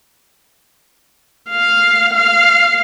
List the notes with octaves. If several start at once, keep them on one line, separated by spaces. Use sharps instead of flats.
F5
F5